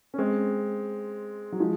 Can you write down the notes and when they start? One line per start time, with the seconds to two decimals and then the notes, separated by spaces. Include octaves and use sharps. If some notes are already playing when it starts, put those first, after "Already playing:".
0.14 C#4
0.18 G#3 C4
1.52 F#3
1.60 F3 G#3